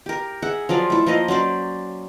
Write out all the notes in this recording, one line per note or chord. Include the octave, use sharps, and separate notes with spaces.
G4 A#4
G#4 E5 F#5
F3 F#3 F4 D5
A3 E4
F3 A#3 D#5
F#3 C#4 C5 D5